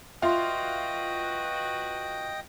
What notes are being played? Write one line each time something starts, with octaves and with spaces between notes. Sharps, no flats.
F#3 F4 F#4 B4 D#5 E5 G5 C6